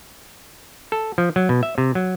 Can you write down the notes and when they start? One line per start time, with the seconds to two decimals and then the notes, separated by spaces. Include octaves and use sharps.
0.92 A4
1.18 F3
1.36 F#3
1.49 B2
1.63 E5
1.78 C3
1.95 F#3